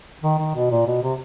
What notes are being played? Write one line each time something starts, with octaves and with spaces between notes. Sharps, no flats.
D#3
D#3
B2
A#2
B2
C3